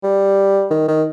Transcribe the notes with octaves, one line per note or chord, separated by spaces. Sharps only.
G3
D#3
D#3